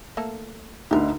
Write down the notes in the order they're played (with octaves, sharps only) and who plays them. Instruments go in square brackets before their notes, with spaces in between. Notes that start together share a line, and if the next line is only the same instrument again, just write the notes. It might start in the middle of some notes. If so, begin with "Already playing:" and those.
[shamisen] A3 A#3 A4
[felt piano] D2 D3 [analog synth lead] D#4 [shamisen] G4 A#4